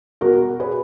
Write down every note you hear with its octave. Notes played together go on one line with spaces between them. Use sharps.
B2 F#4 A#4
G#4 B4